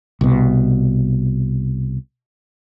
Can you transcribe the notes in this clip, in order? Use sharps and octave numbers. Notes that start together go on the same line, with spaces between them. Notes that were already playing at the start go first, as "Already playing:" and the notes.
C2 B2